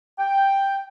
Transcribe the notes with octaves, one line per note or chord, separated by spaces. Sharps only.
G5